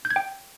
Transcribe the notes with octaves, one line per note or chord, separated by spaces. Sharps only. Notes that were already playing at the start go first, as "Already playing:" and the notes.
G6
G#6
G5